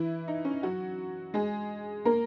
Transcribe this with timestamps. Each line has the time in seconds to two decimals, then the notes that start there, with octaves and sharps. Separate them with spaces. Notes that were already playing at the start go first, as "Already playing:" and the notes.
Already playing: E3 E4
0.28 D#4
0.45 C#4
0.63 F#3 F#4
1.34 G#3 G#4
2.05 A#3 A#4